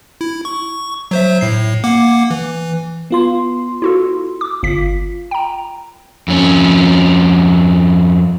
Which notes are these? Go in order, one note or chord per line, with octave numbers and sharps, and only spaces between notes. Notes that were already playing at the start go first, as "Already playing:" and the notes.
E4
C#6
F#3 C5 E5
A2 C7
A#3 F#5 D6
E3
B3 F4 C6
E4 F#4 A4
D6
G1 F4 B6
G5 A#5
F2 C#4